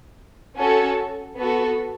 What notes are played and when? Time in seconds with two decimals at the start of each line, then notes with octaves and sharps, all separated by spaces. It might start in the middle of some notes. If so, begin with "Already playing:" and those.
0.58 C#4 F#4 A4
1.37 B3 F#4 A4